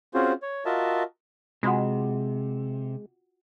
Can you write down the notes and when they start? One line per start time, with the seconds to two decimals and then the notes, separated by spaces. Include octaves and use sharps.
0.14 C4 C#4 F4 F#4 G#4 C5
0.42 C#5
0.65 F4 F#4 A#4 D#5 E5 A5
1.63 C3 G#3 F4 F#4 F#5